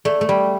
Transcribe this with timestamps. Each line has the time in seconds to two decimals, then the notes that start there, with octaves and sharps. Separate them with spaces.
0.05 A3 D5
0.21 A3
0.29 G3 D5